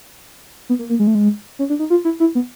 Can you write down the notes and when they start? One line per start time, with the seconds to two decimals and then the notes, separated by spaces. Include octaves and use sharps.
0.69 B3
0.79 A#3
0.89 A#3
0.99 G#3
1.07 A3
1.15 G#3
1.59 C#4
1.70 D4
1.79 D#4
1.90 F4
2.05 E4
2.20 E4
2.35 B3